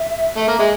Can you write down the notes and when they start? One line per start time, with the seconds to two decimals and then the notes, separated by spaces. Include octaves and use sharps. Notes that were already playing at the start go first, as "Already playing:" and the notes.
Already playing: E5
0.37 A3
0.48 A#3
0.59 G#3